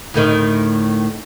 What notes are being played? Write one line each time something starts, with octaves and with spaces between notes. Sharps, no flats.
D2 A2 D#3